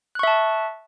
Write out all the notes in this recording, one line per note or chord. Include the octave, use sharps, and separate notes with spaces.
E5 A5 C#6 F#6